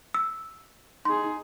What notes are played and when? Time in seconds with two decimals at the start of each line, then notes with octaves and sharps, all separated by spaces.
0.14 E6
1.05 D#4 G#4 C6